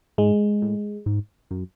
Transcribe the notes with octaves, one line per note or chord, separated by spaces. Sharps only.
G#2 G#3
A2
G#2
F#2